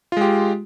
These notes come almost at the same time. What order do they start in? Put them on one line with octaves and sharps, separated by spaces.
F4 G#3 G4